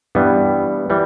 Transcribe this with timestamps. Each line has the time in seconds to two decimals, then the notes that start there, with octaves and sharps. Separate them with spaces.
0.15 G2 E3 G3 B3
0.90 E3 G3